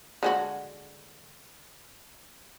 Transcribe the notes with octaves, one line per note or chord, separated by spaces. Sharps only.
D3 G#3 F#4